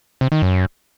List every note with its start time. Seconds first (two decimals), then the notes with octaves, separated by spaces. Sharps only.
0.21 C3
0.32 D#3
0.42 F#2